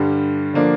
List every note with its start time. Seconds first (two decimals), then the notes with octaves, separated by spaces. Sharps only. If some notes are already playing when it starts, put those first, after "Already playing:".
Already playing: G2 D3 G3
0.54 D3 F3 A#3 D4